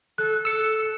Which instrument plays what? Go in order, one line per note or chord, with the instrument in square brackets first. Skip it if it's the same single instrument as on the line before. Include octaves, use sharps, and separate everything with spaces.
[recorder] A4 [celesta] F#6
[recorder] A4 [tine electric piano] E6 C#7